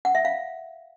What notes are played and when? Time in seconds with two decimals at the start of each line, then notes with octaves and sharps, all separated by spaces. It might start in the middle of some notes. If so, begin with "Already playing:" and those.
0.05 F#5
0.15 E5
0.25 F5